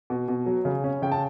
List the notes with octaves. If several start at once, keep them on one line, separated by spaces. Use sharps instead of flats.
B2
B2
F#3
C#3
C#4
C#3 G5
A5